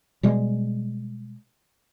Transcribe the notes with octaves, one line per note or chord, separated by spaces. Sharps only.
B2 G3 G#3